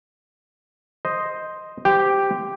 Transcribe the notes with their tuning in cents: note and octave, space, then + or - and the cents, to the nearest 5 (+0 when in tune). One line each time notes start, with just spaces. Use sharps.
C5 +0 D#5 +0
G4 +0 C5 -25 G5 +0